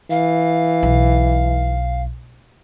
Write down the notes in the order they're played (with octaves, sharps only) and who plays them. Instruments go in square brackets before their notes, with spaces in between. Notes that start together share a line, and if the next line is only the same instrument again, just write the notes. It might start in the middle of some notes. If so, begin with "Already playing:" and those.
[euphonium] E3 [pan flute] F5
[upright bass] B1